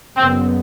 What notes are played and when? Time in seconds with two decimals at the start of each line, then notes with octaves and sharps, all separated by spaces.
0.17 F#1 F#2 C#3 F#3 B3 C4